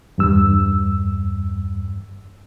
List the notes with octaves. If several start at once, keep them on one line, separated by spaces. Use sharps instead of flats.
E2 G2 E6